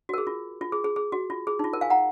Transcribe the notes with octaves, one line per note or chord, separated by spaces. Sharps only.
F#4
A#4
G#4
F4
F4
G#4
G#4
G#4
F#4
F4
G#4
D#4
F4
A#4
F5 G#5
F#5 A#5